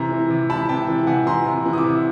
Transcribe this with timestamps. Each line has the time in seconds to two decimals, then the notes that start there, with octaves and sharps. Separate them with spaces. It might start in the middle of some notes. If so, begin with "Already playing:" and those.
Already playing: C3 E3 A#5
0.12 E3
0.31 C3
0.50 E3 A5 B5
0.69 C3 G5 A5
0.88 E3
1.07 C3 F#5 G#5
1.27 E3 A#5 C6
1.46 C3
1.66 E3
1.73 D#6
1.78 D6 E6
1.84 C3